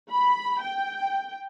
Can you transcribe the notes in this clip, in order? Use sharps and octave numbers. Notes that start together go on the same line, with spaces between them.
B5
G5